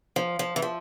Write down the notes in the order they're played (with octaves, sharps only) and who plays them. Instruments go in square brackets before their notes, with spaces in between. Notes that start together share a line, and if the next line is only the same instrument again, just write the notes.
[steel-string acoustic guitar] F3
F3
E3
F3